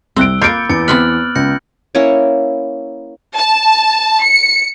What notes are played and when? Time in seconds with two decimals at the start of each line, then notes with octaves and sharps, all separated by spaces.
0.16 C2 C4 E6 F#6 D7 G7
0.42 A#3 F4 B5 D6 G6 A6 C#7 D7
0.69 E2 A6 C#7 D7
0.88 B3 C4 E5 F6 F#6 F#7
1.35 C#2 G6 A#6 C#7
1.95 A#3 C#4 E4 C#5
3.37 A5
4.23 C#7